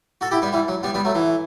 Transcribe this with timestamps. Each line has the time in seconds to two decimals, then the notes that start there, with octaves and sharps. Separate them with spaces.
0.21 F#4 A4
0.31 E4 G4
0.42 G3 B3
0.52 E3 G3
0.68 F#3
0.83 G3 B3
0.94 G3 B3
1.05 F#3 A3
1.15 E3